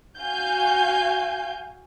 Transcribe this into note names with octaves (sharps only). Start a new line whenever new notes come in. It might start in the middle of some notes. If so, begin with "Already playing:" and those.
F#4 F5 G#5 G6